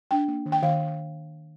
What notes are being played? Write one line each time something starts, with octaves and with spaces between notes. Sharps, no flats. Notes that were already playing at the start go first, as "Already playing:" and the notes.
D4 G5
A#3
D#3
G5
D#3 F5